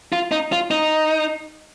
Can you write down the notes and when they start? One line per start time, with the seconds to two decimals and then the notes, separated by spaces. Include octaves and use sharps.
0.12 F4
0.32 D#4
0.52 F4
0.71 D#4